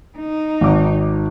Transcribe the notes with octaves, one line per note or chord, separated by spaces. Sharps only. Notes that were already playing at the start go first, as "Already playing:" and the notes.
D#4
G#1 D6